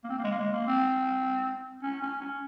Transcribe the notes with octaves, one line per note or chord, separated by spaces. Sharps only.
A#3
C4
A#3
G#3
A#3
G#3
A#3
C4
C#4
C#4
C#4